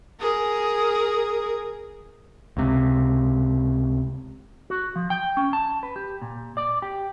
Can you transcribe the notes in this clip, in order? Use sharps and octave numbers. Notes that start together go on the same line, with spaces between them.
G#4 A#4
C#2 C3
F#4
F3
G5
C#4
A5
B4
G4
A#2
D5
G4